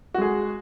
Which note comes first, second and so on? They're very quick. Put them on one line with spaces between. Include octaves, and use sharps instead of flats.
F#4 G#3 G#4